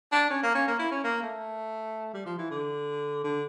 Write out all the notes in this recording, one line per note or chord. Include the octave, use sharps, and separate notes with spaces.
D4
C#4
A#3
C#4
A#3
E4
C#4
A#3
A3
G3
F3
E3
D3
D3